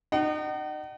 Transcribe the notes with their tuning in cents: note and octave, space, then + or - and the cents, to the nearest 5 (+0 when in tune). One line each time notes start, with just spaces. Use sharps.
D#4 -30 F#5 +40